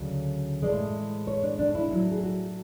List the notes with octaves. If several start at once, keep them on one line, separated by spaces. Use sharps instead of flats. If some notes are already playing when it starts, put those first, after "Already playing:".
Already playing: D2 C#3 F#3
A2 E3 G#3 D5
C#5
D4
D4
E4
A2 F#3 E4
G#4
F#4